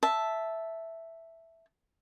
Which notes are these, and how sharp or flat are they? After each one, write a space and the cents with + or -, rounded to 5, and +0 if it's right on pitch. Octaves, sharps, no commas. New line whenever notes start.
E5 +0 A5 -5